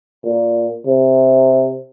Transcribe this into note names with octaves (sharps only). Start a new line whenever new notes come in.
A#2
C3